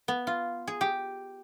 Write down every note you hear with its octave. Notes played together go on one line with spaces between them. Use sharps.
B3
F4
G#4
G4